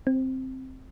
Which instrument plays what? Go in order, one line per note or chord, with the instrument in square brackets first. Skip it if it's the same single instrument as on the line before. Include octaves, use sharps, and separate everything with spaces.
[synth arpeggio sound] C4